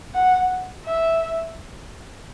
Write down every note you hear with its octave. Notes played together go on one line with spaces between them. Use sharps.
F#5
E5